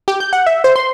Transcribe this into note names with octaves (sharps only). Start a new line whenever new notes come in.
G4
G6
F#5
E5
C5
C6